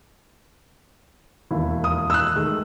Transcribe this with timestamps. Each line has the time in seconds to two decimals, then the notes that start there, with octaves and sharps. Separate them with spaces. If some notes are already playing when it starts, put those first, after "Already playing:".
1.51 E1 D#2 E4
1.84 D#6
2.10 E6 F#6
2.36 D#3 G#3 A3